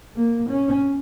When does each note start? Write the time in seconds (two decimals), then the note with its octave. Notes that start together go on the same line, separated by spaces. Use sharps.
0.17 A#3
0.50 C#4